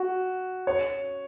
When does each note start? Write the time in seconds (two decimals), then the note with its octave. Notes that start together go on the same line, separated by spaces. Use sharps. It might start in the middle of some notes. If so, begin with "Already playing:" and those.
Already playing: F#4
0.67 C#5